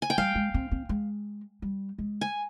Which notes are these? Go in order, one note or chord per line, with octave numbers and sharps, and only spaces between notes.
G#5
G5
G3 F5
G#3
C4
C4
G#3
G3
G#3
G#5